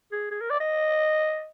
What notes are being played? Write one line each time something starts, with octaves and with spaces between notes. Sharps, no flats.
G#4
G#4
A#4
D5
D#5